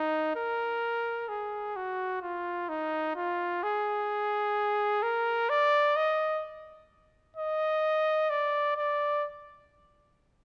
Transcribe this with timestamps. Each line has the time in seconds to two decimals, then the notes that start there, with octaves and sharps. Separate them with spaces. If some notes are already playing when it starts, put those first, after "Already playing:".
Already playing: D#4
0.36 A#4
1.28 G#4
1.76 F#4
2.22 F4
2.69 D#4
3.16 F4
3.63 G#4
5.03 A#4
5.49 D5
5.96 D#5
7.36 D#5
8.30 D5
8.77 D5